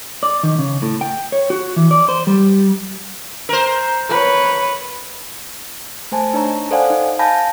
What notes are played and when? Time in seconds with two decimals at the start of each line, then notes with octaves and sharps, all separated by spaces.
0.23 D5
0.43 D#3
0.59 C#3
0.82 A2
1.01 G5
1.32 C#5
1.50 F#4
1.76 E3
1.91 D5
2.09 C5
2.27 G3
3.49 A#4 C5
4.09 B4 C#5
6.12 A3 C5 G#5 A5
6.34 D4 D#4 C#5 A#5
6.71 A4 C5 D5 F5 F#5 G#5
6.90 D#4
7.19 F5 G#5 A5 B5 G6 A#6